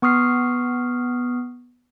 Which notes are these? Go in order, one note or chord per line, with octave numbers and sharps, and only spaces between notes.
B3 C#6 D#6 F6 C7